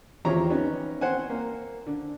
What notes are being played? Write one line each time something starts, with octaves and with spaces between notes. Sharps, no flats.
E2 F3 C4 G4 C#5 A#5
B3 C#4 D#4
C4 C5 F#5 G#5
A#3
D3